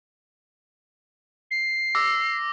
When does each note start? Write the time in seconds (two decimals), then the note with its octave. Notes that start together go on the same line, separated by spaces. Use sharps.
1.51 C7
1.95 D6 E6 A#6